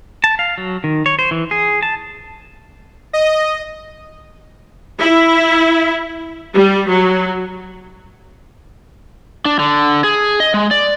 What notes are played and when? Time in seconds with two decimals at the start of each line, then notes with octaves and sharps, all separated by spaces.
0.24 A5
0.39 F5
0.58 F#3
0.84 D#3
1.06 C#5
1.19 C5
1.31 E3
1.51 G#4
1.83 A5
3.13 D#5
4.99 E4
6.54 G3
6.89 F#3
9.45 D4
9.59 D3
10.04 G#4
10.40 D#5
10.54 G#3
10.71 D5